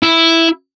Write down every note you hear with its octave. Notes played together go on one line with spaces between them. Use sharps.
E4